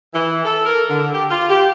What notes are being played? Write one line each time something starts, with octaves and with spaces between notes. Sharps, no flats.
E3
A4
A#4
D3
G4
F4
G4